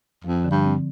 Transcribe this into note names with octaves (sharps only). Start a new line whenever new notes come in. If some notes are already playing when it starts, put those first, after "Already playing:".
F2 F3
D3
G2
C4